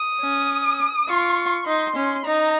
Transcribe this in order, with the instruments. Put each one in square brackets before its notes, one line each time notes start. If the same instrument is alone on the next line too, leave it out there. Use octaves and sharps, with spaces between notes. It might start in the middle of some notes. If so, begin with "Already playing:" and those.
Already playing: [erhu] D#6
[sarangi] C#4
[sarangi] F4 [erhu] C#6
[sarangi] D#4 [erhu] C6
[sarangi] C#4
[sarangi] D#4 [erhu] A#5